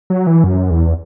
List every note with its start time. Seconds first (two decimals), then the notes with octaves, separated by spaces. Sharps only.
0.10 F#3
0.27 E3
0.44 F#2
0.71 E2